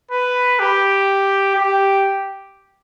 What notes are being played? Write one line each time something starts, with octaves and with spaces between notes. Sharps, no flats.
B4
G4
G4